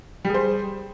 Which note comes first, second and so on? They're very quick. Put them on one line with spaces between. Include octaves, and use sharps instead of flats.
G3 G#4 C5